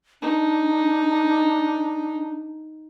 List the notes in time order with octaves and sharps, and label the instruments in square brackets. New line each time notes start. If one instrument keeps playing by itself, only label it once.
[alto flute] D4 [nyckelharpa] D#4